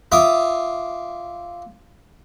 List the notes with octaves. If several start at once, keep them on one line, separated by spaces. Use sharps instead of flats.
F4 E5 D6 D#6